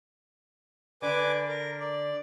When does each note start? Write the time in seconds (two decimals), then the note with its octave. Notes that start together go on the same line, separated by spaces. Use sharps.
1.02 D3 B4 G#5 D6
1.48 A#4
1.80 D5